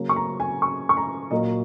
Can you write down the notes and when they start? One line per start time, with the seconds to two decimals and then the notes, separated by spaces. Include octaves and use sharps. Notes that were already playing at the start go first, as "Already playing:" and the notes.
Already playing: C#3 F#3 A#3 C#4
0.09 C#6
0.16 A#5
0.40 G#5
0.62 C#6
0.89 C#6
0.97 A#5
1.31 A#2 F#3 A#3 D#5